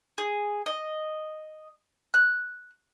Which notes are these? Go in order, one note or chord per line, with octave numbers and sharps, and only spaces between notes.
G#4
D#5
F#6